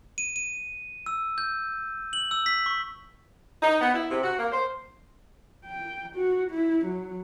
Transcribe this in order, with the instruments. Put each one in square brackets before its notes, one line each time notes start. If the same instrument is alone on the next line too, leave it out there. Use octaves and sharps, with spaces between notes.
[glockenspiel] D#7
D#7
E6
G6
F#7
E6
B6
C#6
[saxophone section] D#4
B3
E4
C3
F#4
A#3
C5
[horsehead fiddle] G5
F#4
E4
F#3